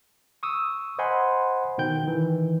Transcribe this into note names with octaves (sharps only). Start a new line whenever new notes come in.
C#6 D#6 E6
C5 D#5 F#5 G#5 B5 C6
B2 D#3 G5 G6
D#3 E3